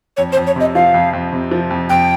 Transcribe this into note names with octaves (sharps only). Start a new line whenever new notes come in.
F2 C#5
C5
F2
C#5
C3 D#5
F3 F5
F2
F2
C3
F3
F2
F2 G5